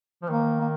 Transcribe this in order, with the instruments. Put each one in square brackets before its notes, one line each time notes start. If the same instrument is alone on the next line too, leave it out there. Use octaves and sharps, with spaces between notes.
[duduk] F3
[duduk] D#3 [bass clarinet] A#3
[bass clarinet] A#3